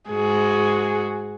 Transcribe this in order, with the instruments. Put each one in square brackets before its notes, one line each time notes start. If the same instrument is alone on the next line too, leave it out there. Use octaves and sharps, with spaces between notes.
[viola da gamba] G#2 F#4 [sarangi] G#4